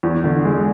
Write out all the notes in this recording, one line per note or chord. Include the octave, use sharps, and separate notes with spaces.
E2
D3
G#3